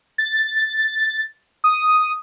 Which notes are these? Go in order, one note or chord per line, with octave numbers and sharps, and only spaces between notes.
A6
D#6